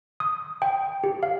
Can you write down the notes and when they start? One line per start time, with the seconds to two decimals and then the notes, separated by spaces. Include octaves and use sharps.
0.20 D#6
0.62 G5
1.04 G4
1.23 F5